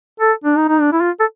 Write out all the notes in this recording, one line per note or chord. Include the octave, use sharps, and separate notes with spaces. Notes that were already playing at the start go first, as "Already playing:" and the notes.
A4
D4
D#4
D#4
D4
E4
F4
A4